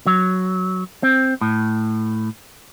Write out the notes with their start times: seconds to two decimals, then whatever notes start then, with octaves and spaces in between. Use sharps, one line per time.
0.06 F#3
1.03 C4
1.41 A2